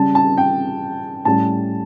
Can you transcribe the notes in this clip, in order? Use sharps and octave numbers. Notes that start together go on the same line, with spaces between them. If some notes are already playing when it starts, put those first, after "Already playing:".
Already playing: C#3 G3 C#4 A5
A5
G5
A2 G3 C#4 A5